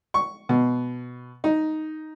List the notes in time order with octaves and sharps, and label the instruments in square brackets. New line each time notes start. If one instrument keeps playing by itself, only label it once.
[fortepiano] C#6
B2
D#4